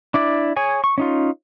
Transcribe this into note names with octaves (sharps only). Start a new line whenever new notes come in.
D4 E4 D5
G#4 C#5 G#5
C#6
C#4 D#4 F4